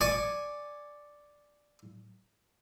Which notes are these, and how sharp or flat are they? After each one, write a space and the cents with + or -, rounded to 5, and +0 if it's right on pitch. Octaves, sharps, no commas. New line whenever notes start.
D5 +0 G#5 +0 C#6 +0